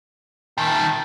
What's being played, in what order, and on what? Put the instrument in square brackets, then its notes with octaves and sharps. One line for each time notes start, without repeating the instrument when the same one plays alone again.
[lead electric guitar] A#2 D#3 [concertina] G5 A5